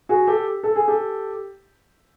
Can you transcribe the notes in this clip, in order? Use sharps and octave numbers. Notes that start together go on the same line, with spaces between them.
F#4 G#4
G4 A4
A4
G#4
G4 A4